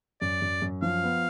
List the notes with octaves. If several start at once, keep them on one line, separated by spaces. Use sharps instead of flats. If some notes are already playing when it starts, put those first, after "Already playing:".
F#2 D5
F#2
F#2
F3 F5
B3